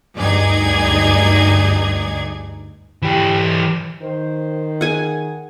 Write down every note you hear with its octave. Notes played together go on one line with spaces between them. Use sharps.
D2 G2 D#4 G#4 D5 G#6
E3 G4
D#3 C5
G#4 F#5 G#5